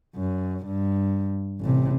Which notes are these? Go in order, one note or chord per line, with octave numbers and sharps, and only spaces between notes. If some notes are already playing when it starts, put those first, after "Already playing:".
F#2
G2
A1 C3